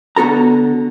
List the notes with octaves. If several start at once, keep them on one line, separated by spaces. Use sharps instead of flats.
D3 B3 F#4 A4 A#5